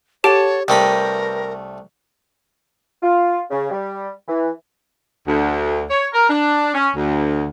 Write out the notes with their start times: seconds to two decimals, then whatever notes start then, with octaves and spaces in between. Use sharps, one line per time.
0.24 G4 A4 C#5 F#5 A5 D7
0.68 C2 A3 A#4 B4 D#5 G5 B5
3.03 F4
3.50 C#3
3.71 G3
4.28 E3
5.27 D2
5.90 C#5
6.13 A#4
6.29 D4
6.74 C#4
6.96 D2